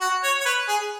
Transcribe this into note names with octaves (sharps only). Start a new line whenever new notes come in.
F#4
C#5
C#5
B4
G#4